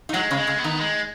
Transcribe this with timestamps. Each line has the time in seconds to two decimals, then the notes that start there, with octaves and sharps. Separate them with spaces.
0.09 D#4
0.13 F#3 G#3 F#4
0.31 C#3 C#4
0.37 G#3
0.47 C#3 C#4
0.58 B3
0.64 D#3 D#4
0.80 G#3